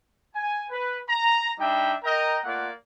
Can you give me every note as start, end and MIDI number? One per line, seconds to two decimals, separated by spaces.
0.35 0.66 80
0.70 0.98 71
1.09 1.50 82
1.59 1.93 55
1.59 1.93 62
1.59 1.93 63
1.59 1.93 76
1.59 1.93 79
2.04 2.38 70
2.04 2.38 75
2.04 2.38 79
2.04 2.38 82
2.44 2.69 57
2.44 2.69 58
2.44 2.69 65
2.44 2.69 74
2.44 2.69 78